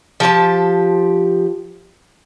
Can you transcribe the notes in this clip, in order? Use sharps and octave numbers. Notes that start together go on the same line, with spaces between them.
F3 G4 C#5 A5